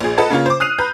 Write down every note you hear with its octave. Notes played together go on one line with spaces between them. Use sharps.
A#1 G#4
A4 B4 D#5 F#5 A5
C#3 A#3 C#4 F4
C5 D6
D#6 F6 F#6 C7 D#7 F7
B4 A#5 G6